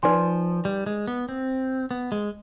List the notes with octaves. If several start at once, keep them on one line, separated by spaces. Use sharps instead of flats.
F3 D#4 B4 D5 G#5 C6
G3
G#3
B3
C4
B3
G#3